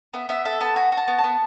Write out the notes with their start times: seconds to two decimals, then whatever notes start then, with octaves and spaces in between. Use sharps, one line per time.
0.14 B3 E5
0.29 B3 E5
0.45 A4 E5
0.61 B3 A5
0.76 F#4 G#5
0.92 F#4
0.97 A5
1.08 B3
1.18 A5
1.24 B3